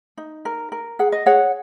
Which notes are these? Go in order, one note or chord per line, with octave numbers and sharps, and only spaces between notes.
D#4
A#4
A#4
G#4 F#5
D#5
G#4 C#5 F#5